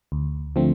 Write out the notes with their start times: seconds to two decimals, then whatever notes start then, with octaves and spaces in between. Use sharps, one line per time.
0.12 D2
0.56 D3 F3 A3 C4